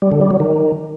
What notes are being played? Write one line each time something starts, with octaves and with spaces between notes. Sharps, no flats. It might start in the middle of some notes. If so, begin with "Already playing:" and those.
G3
D3
G3
F#3
D#3